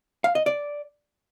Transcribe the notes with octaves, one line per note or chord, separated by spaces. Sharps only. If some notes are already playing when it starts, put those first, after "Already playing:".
F5
D#5
D5